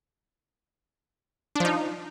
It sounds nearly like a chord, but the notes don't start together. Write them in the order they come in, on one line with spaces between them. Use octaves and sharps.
D4 F3 D#4